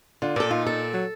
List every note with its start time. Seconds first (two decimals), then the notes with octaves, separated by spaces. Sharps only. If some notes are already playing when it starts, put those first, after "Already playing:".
0.22 D3 F4
0.36 A#2 A4 A#4 D5
0.51 D#4 F4
0.66 A4
0.94 F#3